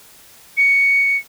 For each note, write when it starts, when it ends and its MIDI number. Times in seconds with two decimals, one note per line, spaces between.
0.57 1.17 97